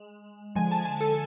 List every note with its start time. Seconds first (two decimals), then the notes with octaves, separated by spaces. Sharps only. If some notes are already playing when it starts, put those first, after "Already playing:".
Already playing: G#3
0.55 D3 F3 G#3 G#5
0.71 A5
0.85 G#5
1.01 A4